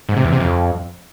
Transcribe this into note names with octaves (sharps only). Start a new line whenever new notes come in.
G#2
C3
E2
C3
F2